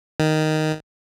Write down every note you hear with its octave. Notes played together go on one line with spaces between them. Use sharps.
D#3